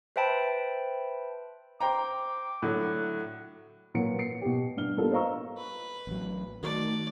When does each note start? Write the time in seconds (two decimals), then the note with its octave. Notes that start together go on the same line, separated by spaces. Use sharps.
0.16 B4 C5 E5 G5 A5 B5
1.81 C5 G5 A#5 D6
2.62 A2 D3 F#3 F#5
3.94 A#2 F#3 B4 C#7
4.19 C7 C#7
4.41 B2 G4
4.77 G2 D4 F6 G7
4.97 G3 A#3 B3 D4 F4 A4
5.12 C5 D#5 F5 A#5 C#6 E6
5.57 B4
6.07 A1 F#3
6.63 D#3 A3 F#4 D5